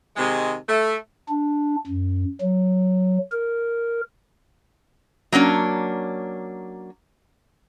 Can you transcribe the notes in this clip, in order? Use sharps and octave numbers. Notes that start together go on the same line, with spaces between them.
C3 D#3 G#3
A3
D4
F#2
F#3
A#4
F#3 A#3 C#4 D4